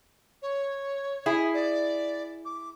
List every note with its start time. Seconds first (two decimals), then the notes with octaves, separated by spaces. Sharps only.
0.42 C#5
1.26 E4 G#4
1.54 D5
2.45 D6